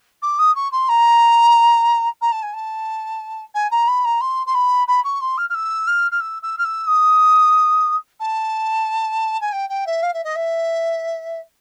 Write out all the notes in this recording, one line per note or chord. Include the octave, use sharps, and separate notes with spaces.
D6
D#6
C#6
C6
A#5
A#5
A5
G#5
A5
G#5
A#5
B5
A#5
C6
C6
B5
B5
C#6
C6
F6
F6
E6
F6
F6
E6
E6
F6
E6
D#6
A5
G#5
G5
G5
E5
F5
E5
D#5
E5